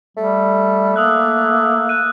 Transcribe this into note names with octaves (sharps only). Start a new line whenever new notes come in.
G3 A3
A#3 D#6 E6 F#6
F#6 D#7